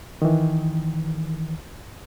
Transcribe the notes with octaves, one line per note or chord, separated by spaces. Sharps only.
D#3 E3